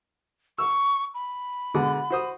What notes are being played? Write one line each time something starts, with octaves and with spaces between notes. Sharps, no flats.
C#6 E6
B5
B2 D3 G#3
F#4 C5 D#6